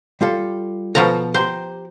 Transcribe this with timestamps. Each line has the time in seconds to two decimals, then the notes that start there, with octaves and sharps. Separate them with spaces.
0.21 G3 F4 A4
0.95 B2 F3 A4 A#5
1.34 G4 C5 A#5 C6